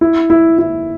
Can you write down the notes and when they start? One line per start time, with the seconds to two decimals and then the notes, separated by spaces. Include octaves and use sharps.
0.01 E4
0.30 E4
0.59 E4